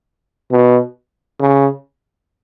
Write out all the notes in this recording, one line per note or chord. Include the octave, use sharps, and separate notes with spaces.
B2
C#3